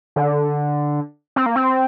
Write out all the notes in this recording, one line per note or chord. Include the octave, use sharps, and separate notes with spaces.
D3
C4
A#3
C4